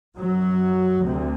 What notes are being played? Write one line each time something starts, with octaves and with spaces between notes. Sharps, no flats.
F#2 F#3
D2 C3